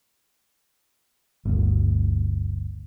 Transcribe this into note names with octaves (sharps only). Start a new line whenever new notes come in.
G1 D2